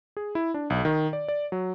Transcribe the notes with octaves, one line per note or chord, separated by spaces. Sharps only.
G#4
E4
D4
B1
D#3
D5
D5
F#3